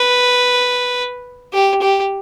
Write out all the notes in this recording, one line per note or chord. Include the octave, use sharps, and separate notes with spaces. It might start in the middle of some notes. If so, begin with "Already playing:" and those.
Already playing: B4
G4
G4